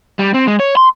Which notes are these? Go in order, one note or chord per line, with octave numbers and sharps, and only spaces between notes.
G3
C4
G#3
C#5
C6